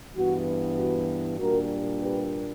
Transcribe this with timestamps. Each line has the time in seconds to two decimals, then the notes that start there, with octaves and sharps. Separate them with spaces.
0.16 G2 E3 B3 F#4
0.78 F#4
1.39 A#2 G3 A#3 D4 F#4 A#4
2.01 G4 B4